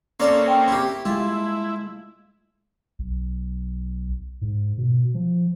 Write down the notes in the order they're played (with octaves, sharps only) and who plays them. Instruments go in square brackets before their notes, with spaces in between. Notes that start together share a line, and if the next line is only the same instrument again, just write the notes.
[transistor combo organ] A#3 C4 C#4 [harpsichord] A4 D5 F5
[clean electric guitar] G5
[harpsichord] E4 G4
[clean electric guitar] G#3 A3 [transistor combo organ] E4 [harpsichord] F4
[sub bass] B1
G#2
B2
F3